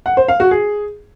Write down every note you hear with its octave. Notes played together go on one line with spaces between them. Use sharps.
F#5
C5
F5
F#4
G#4